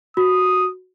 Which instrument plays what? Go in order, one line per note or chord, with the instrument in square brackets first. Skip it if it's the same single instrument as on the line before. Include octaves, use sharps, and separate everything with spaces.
[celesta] F#4 [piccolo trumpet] D#6